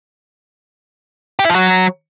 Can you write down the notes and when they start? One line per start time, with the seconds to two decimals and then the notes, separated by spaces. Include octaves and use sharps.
1.39 G4
1.45 E4
1.50 F3
1.55 F#3